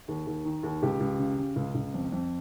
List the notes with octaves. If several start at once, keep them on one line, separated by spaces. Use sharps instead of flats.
D#2
D#2
D#3
D#2
C#2 G4
C#2
C#3
C#3
C#2
C#2
F2
F2